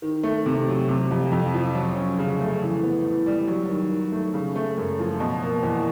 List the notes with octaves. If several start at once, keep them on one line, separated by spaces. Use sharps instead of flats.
D#3
A3
C3
F#3
C3
F2
F2
F3
F#3
C#4
C#3
A3
E3
B3
A2
G3
F#3
D#3
D#3
A3
C#3
A3
F#2
F3
B2
A#3
E2